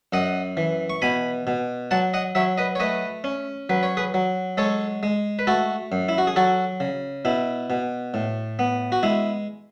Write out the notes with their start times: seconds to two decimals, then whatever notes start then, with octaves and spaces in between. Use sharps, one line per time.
0.13 F#2 D#5 F#5
0.57 E3
0.90 C#6
1.02 B2 G#5 B5
1.47 B2
1.91 F#3 F#5 A5
2.14 D#5 F#5
2.35 F#3 C#5 E5
2.58 B4 D#5
2.75 C#5
2.80 A3 B4 D#5
3.24 C#4
3.69 F#3 B4
3.83 C#5
3.97 G#4 B4
4.14 F#3
4.57 G#3 A4 C#5
5.03 G#3
5.39 B4
5.47 A3 F#4 A4
5.92 F#2
6.09 E4
6.18 F#4
6.27 G#4
6.36 F#3 F#4 A4
6.80 C#3
7.25 B2 E4
7.70 B2
8.14 A2
8.59 B3
8.92 F#4
9.03 G#3 E4